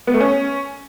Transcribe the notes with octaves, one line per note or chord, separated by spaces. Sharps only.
B3
A3
C#4